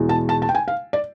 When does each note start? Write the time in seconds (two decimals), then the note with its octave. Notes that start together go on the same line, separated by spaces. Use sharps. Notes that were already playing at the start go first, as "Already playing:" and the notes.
Already playing: E2 B2 G#3
0.09 A5
0.29 A5
0.42 A5
0.49 G5
0.55 G#5
0.68 F5
0.93 D5